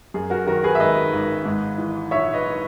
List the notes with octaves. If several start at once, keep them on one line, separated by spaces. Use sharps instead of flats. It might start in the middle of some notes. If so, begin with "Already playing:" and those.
F#2 G#4
F#4 A#4
D#3 F#4 A#4
G#4 B4
E5
G#1 B4 D#5
G#1
G#2
E3
A#1 C#5 E5
B4 D#5